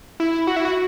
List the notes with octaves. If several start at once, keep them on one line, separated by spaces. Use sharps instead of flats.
E4
F#4
E4
F#4